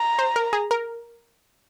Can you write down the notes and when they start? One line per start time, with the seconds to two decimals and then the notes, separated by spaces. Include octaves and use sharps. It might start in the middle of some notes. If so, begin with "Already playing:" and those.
Already playing: A#5
0.19 C5
0.36 A#4
0.53 G#4
0.71 A#4